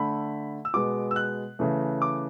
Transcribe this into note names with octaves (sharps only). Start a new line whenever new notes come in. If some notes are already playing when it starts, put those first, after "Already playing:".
Already playing: D3 A3 B5
E6
B2 G#3 B3 D6
E6
F#6
C#3 E3 A3
D6